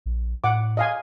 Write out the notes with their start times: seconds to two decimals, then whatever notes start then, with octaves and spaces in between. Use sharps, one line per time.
0.06 A#1
0.44 A2 F#5 D6
0.77 D#5 F5 G#5